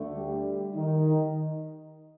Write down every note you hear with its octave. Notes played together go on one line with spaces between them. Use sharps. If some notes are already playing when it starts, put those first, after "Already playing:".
Already playing: D2 D3 A3
G3 G4
D#3 D#4